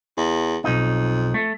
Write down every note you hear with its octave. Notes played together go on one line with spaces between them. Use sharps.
E2
B1 F2 D#4
A3